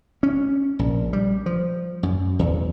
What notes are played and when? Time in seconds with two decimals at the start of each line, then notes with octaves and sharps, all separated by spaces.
0.23 C#4
0.79 A#1
1.13 G3
1.46 F3
2.03 F#2
2.39 E2